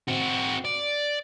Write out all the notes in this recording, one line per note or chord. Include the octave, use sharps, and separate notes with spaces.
C4 F#4
D5